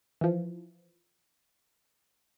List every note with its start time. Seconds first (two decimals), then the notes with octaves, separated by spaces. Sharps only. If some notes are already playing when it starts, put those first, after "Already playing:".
0.21 E3 F3